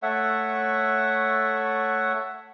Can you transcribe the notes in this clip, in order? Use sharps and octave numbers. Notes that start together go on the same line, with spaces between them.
A3 C#5 E5 F#5